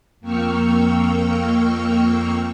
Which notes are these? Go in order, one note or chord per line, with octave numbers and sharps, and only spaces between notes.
F2 A#3 G5 C#6 E6 F6